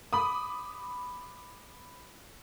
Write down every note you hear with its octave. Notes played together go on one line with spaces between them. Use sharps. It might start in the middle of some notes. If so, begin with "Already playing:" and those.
B5 D6 D#6